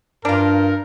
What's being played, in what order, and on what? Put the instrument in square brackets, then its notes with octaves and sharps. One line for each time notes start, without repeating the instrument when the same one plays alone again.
[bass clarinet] G2 [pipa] D4 F4 [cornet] A#4